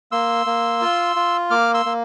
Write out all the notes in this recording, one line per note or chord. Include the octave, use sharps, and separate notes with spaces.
A#3 C6 E6
A#3
F4
F4
A#3 D6 F6
C6 E6
A#3